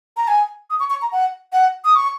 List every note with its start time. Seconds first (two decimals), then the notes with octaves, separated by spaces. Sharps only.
0.17 A#5
0.28 G#5
0.70 D#6
0.80 C#6
0.90 C#6
1.02 A#5
1.12 F#5
1.53 F#5
1.84 D#6
1.95 C#6